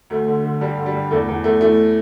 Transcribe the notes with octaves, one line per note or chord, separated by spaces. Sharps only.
D2 A3
D3
D3
G2 G3
D3
G3
G2
E2 A3
E2
E2 A3
E3 A3